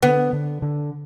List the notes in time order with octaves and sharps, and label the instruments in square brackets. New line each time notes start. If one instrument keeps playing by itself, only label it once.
[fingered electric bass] D3 [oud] B3
[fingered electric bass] D3
D3